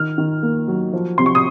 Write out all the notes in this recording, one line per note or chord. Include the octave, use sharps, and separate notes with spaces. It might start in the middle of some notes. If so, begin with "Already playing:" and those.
Already playing: D#3 F6
D#3
A#3
F#3
F3
C3 C6
C#6
D#6